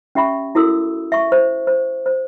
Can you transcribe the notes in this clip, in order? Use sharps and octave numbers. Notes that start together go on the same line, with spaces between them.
C#4 G4 E5 B5 C#6
E4 F#4 A4 A#4 D#6 E6
E5 C#6
C5
C5
C5